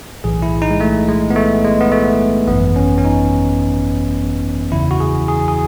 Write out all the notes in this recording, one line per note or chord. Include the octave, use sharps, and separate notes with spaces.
B1 A2 E3 G#4
E4
D#4
G#3
A3
G#3
B3
A3
G#3
B3
A3
G#1 F#2 E3 B3
C#4
C#4
D#4
E2 C#3 E3 E4
F#4
G#4
G#4
G#4